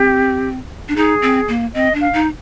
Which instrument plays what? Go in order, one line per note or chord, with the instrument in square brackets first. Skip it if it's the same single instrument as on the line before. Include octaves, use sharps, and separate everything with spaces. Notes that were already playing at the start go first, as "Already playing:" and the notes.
Already playing: [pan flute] C4 [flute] G4
[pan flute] D4
[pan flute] D#4 [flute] G#4
[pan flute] C4
A#3
[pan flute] C4 [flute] D#5
[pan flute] D4
[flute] F5
[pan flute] D#4